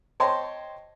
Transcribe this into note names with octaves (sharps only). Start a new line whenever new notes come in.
C5 C#5 D#5 G5 A5 C6